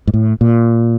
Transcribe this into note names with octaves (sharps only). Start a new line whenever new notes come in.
G#2
A2
A#2